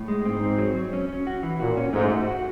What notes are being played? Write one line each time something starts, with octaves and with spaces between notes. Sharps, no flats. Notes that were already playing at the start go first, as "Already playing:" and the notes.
Already playing: A2
G#3
G#2 C4
C4
F#3
F#3
C#4
C#4
F#4
E3
A#2 F#4
C#4
G#2 A3
F#4
F#4